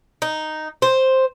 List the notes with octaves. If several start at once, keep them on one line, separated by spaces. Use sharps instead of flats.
D#4
C5